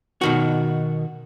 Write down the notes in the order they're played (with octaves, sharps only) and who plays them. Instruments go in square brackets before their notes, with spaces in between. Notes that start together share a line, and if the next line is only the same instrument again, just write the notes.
[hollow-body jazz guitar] B2 D#3 F#4